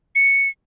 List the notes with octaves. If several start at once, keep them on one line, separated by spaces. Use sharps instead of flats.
C#7